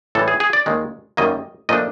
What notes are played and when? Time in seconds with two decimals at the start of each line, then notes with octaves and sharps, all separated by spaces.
0.15 A2 E3 G3 A4
0.28 G#4
0.40 G#4
0.53 D5
0.66 D#2 D#3 G#3
1.17 F#2 D#3 G3 A#3 D#5
1.69 A#2 F3 A3 D4 D#5